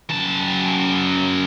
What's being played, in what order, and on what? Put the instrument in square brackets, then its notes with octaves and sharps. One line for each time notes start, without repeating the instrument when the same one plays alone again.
[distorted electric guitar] F#2 A5